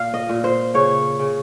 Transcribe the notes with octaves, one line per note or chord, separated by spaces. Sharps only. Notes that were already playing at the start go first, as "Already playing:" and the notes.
Already playing: A#2 F5
D#5
A#2
C5
C#3 C#5
C#3